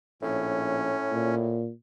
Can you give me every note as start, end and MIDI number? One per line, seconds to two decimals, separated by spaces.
0.22 0.96 34
0.22 1.66 45
0.22 1.35 61
1.12 1.70 46